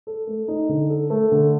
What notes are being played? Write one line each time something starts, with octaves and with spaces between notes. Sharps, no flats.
A4
A3
D#4
D3
A4
A3
D3